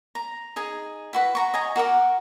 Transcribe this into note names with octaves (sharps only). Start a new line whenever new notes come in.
A#5
D#4 G#4 G#5
E4 F#4 B4
F#4 A#5 C#6
D#5 G#5 A#5
F#4 A#4 F#5 D6